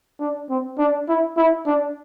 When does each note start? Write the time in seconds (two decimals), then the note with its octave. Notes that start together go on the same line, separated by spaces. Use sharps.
0.20 D4
0.49 C4
0.78 D4
1.08 E4
1.37 E4
1.66 D4